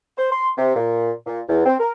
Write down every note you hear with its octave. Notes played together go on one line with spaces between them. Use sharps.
C5
C6
C3
A#2
A#2
E2
C4
A#4